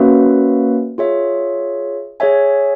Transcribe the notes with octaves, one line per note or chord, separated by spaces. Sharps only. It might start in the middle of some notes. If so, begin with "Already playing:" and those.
Already playing: A#3 C#4 F#4 B4 E5
F4 G#4 C#5 E5
G#4 C#5 E5 G#5